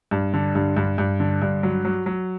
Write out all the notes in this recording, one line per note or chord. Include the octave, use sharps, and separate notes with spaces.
G2
D3
G2
G2
G2
D3
G2
F#3
F#3
F#3